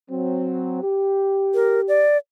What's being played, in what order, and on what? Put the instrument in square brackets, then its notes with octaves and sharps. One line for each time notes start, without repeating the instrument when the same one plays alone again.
[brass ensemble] F#3 C4
G4
[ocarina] A#4
D5